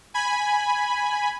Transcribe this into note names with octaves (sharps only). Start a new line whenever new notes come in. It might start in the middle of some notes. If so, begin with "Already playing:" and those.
G#5 B5